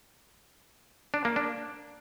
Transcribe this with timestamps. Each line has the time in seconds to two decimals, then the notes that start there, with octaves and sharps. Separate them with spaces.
1.14 D4
1.25 A#3
1.36 D4